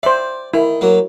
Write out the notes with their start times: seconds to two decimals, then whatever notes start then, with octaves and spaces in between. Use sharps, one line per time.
0.03 C5 D5 E5
0.54 D#3 E4
0.81 F#3 A#3